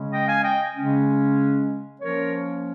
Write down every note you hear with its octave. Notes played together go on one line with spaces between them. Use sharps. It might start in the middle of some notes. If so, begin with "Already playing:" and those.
Already playing: C#3 G#3 C#4
D#5 G5
F5 G#5
D#5 G5
C#3 G#3 C#4
F3 A#3 C#4 A#4 C#5